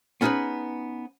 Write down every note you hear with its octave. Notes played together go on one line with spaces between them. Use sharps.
B3 C#4 D#4 F4 G#4 B4